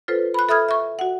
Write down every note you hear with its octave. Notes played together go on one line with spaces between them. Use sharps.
F4 A4 B4 C5
B5 F#6
A4 E5 B5 D#6 F6 G#6
E5 C#6
F#4 F#5